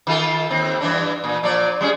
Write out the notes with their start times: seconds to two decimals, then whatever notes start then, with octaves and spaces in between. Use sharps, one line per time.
0.07 D#3 F4 A4
0.50 D#2 C4
0.81 G2 E3 D4
1.24 A#2
1.43 A#2 F3 D5
1.81 G3 C#4 G#4